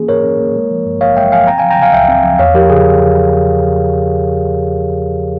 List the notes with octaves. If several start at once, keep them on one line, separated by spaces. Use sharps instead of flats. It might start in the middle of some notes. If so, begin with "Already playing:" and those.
Already playing: E3 A#3 C#4 G#4
G#2 A#4 C#5
C#4
A#3
G#3
F3
G2
G#1 C#5 F5
G#3 E5 G5
F3 F5 G#5
C4 G5 A#5
F3 F5 G#5
G5 A#5
C#3 F5 G#5
C#2 E5 G5
C4
F3
E2 C#5 F5
F3 G4 A#4
C#3 G#4